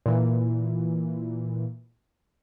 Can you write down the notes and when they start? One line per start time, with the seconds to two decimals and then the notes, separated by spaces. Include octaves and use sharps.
0.06 A#2 E3